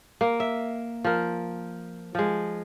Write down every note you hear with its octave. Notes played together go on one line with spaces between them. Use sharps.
A#3
E5
F3 A#4
F3 G#3